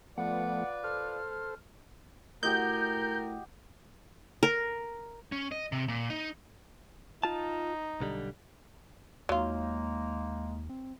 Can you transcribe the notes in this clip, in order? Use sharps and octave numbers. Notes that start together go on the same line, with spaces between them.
F3 A3 B3 F4 B4 D5 F#5
A4 C5 F6
A2 F#4 G4 A#4 D#5 G6
A#4
C#4
D#5
C3
A#2
D#4
D#4 F4 A5
B1 D3 G3
D#2 F#3 G#3 A#3 D#4 F4
C4